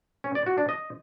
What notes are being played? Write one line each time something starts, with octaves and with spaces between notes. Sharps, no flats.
C#4
D5
F#4
D4
D#5